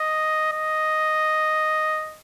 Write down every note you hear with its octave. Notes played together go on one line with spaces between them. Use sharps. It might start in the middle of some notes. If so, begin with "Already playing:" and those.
Already playing: D#5
D#5